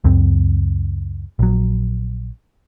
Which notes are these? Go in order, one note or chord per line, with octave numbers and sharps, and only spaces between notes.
C#2 F#2 C4
A#1 F#3